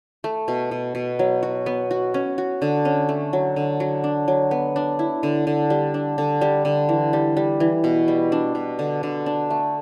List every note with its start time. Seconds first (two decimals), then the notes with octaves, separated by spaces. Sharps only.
0.24 A3
0.48 B2
0.71 B2
0.95 B2
1.19 F#3
1.43 F#4
1.66 B3
1.91 F#4
2.14 C#4
2.38 F#4
2.62 D3
2.85 C#4
3.09 A3
3.33 F#3
3.56 D3
3.80 F#3
4.04 D4
4.28 F#3
4.51 B3
4.76 D4
4.99 E4
5.23 D3
5.47 D3
5.70 G3
5.94 D4
6.18 D3
6.41 G3
6.65 D3
6.89 E3
7.13 G3
7.37 G3
7.60 E3
7.84 B2
8.08 G3
8.32 D4
8.55 B2
8.79 D3
9.03 D3
9.26 D4
9.50 A3